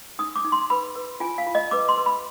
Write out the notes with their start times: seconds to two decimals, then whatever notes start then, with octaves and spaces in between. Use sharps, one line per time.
0.19 D#4 D#6
0.36 D6
0.44 D#4
0.52 C6
0.70 B4 B5
0.95 B4
1.20 F4 G#5
1.38 F5
1.46 F4
1.55 D#5
1.71 B4 D6
1.89 C6
1.97 B4
2.06 B5